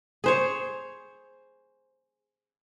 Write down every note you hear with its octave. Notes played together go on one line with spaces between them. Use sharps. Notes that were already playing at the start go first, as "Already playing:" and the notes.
G#4 C5 C#5